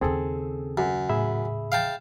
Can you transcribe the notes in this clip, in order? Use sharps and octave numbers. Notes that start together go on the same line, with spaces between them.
D#2 C#3 C4 G#4 A4
F#2
A2 G#4 E5 B5
F5 G5 A5